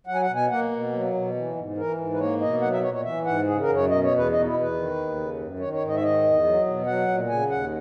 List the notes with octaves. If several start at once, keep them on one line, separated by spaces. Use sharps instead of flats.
F#3 F#5
G#5
F#5
B2
G#5
A#3 F#5
B2
F#3
B2
E3
G#2
E3 A#4
G#2
B4
A#3 C#5
B2 D#5
F#3 F#5
E5
A#2 C#5
C#5
E3 E5
G#2 F#5
C#3 G#4
A#4
F#2
C#5
B2 D#5
C#5
E2
B4
B2 D#5
D#4
E4
E2
B4
D#3
D#2
C#3
F#2
D#3 C#5
C#5
G#2
D#5
E5
D#3 D#5
E2
F#3
B2
F#3 F#5
A#2
C#3 G#5
D#2 F#5